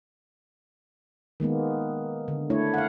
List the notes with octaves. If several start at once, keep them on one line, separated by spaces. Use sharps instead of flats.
D#3 G#3 A#3 B3
D3
A3 D4 E4 C#5
F5 F#5